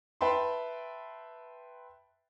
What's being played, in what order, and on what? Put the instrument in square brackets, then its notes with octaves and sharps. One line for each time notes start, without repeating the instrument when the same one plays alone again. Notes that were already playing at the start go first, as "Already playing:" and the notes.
[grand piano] B4 E5 G5 A5 B5 C6